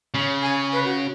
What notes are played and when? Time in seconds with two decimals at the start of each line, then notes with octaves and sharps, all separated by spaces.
0.15 C#3
0.42 G#5
0.73 B4
0.85 F#4